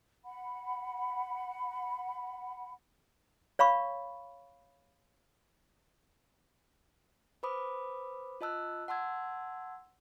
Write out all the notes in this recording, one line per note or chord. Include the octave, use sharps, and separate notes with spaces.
F#5 B5
C#5 F5 B5 C#6
B4 C5 B5 D6 D#6
F4 D#5 A5 E6 F#6
F#5 A5 C6 E6 G#6